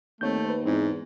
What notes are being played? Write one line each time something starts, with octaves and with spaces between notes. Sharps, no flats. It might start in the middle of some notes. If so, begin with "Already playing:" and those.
D#2 A3 C4 C#5 G6
B4 C5
E2 G#2 C4 D#4 E4